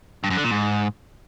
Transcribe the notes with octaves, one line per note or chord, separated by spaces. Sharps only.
G2
F#2
D3
A#2
G#2